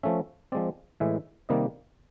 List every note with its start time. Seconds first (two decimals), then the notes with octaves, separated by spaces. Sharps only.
0.03 F3 A3 C#4 E5
0.52 F3 G#3 C4 D5
1.00 A2 E3 G#3 E5
1.49 C3 D#3 G3 A#3 D#5